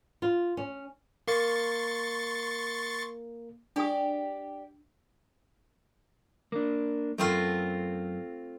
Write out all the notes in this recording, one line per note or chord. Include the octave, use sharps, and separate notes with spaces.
F4
C#4
A#3 C6 C#6 A6
D4 G4 G#4 D5 D#6
A#3 D4
F#2 A3 C4 F4